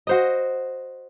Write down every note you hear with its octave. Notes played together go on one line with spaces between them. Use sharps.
F#4 C5 D#5